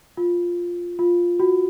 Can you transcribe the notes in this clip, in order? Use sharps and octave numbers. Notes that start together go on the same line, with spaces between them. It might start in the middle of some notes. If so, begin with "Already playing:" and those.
F4
F4
F#4